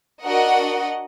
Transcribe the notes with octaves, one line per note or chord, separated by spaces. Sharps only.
D4 F#4 A#4 D#5 F#5